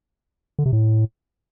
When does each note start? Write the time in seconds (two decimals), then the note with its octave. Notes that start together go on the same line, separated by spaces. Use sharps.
0.59 D3
0.66 C3
0.73 A2